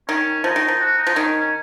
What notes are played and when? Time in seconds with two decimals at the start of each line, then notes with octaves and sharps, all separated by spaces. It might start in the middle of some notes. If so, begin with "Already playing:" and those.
0.09 D#3 C#4
0.44 F3 D#4
0.56 D#3
0.68 F3
0.80 F#4
0.98 D#4
1.07 F3
1.16 D#3 C#4
1.39 C#4